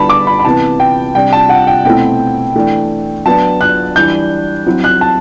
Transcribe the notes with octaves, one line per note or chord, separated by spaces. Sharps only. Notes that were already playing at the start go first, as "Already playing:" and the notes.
Already playing: D3 G3 B3 E4 A5 B5
D6
B5
B5
C3 E3 B3 A5
G5
C3 G3 D4 G5
A5
F#5
G5
B2 A3 C4 E4 G5
E3 A3 D4
F#3 B3 D4 A5
F#6
E3 G3 D4 G6
F#3 C4 E4
F#6
A5